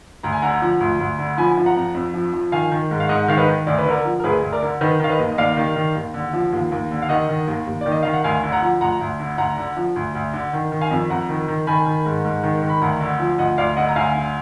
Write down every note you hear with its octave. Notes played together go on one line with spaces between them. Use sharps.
D2 A#5
G#5
D3 F#5 A#5
F3
D2
D2
D3
F3 G#5 B5
F3
F#5 A#5
F2
F2
F3
F3
D#3 F5 G#5
D#3
G#2
F5
G#2 D#5 F#5
D#3 F5
B4 D#5
D#3
D2 D5
B4
D3 A#4 D5
F3
A#4
D2 G#4 B4
D2
A#4 D5
D3
D#3 B4 D#5
D#3 F5
B4 D#5
D#2
D#5
D#2 D5 F5
D#3
D#3
D#2
D3
F3
D#2
D#2
D3
F5
D#3 D#5 F#5
D#3
D#2
D#2
D#3 D5
D#5
D#3 F5
F#5
D2 F5 G#5
D3
F#5 A#5
F3
D2 F#5 A#5
D2
D3
D2 F#5 A#5
D3
F3
D2
D2
D3
D#3
D#3
F5 G#5
F2
F2 F#5 A#5
D#3
D#3
D#3 G#5 B5
D#3
G#2
G#2
D#3
D#3
B5
D2 F#5 A#5
D3
F3
D2 D#5 F#5
D2 D5 F5
D3 D#5 F#5
A#5
D2 F5 G#5
D3